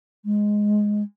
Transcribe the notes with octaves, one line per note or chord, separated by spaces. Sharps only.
G#3